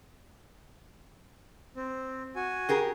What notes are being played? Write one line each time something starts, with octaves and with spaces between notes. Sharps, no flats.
C4
F#4 G#5
G4 G#4 A#4